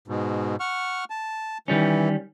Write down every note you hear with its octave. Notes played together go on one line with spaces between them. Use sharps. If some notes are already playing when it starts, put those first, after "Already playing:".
G#2 B2
F#5 C#6 F6
A5
D#3 E3 G3 C#4